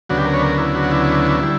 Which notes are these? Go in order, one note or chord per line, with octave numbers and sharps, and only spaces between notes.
D2 C#3 F#3 B3 D4 F#4
G4
A#4
C#5
A#4
E4
F#4
E4
D3 G3 E4